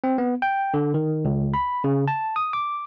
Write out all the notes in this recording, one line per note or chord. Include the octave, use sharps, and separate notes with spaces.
C4
B3
G5
D3
D#3
C#2
B5
C#3
A5
D#6
D6